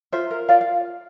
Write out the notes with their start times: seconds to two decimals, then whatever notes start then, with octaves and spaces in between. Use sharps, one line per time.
0.12 F4 C5 E5
0.31 A#4
0.49 F4 D5 F5
0.61 F5